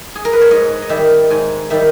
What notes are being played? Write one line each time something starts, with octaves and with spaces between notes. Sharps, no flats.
G#4
A#4
B4
C#5
G#2 D#5
D#5
D#3 G3 E5
G#2 G#5
D#3 G3 E5